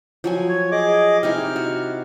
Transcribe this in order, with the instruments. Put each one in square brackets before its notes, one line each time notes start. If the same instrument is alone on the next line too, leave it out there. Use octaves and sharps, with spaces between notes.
[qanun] F3 F#3 G#5
[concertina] C#5
G#4 D#5 D6
[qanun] C3 D#4 E4 [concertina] F6
[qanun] F#4